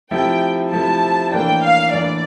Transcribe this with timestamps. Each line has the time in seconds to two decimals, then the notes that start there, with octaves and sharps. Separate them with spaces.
0.11 C3 F3 A3 E4 G5
0.72 C3 F3 A3 E4 A5
1.32 A2 E3 A#3 D4 G5
1.62 F5
1.92 A2 E3 A#3 D4 D5